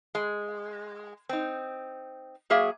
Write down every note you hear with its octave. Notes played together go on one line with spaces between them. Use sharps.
G#3
C4 D#4
F#3 A#3 G#4 E5